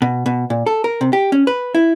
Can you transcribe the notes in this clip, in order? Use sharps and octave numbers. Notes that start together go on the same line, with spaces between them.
B2
B2
A#2
A4
A#4
C3
G4
C#4
B4
E4